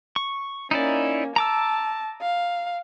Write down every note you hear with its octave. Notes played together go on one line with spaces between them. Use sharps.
C#6
A#3 C#4 D#4 E4 D5
A5 A#5 D6 E6
F5